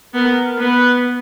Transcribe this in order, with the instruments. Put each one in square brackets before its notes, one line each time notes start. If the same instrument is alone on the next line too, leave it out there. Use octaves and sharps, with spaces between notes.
[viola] B3 [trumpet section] A#4
[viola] B3 [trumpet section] B4